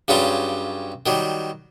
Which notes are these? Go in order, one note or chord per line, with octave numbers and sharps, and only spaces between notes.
G2 C#3 F#3 G3 F4
D#3 F#3 G3